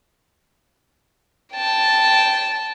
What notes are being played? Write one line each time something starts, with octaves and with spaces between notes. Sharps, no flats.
G5 A5